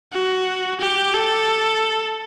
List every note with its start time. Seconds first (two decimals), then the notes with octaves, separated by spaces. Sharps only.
0.13 F#4
0.80 G4
1.14 A4